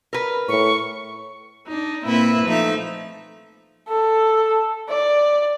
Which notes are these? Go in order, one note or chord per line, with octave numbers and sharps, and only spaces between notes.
A#4 B4
A2 C#6
D4 D#4
A#2 A#3 C4 E4 B4 E5
F3 A3 D#4 E5
A4
D5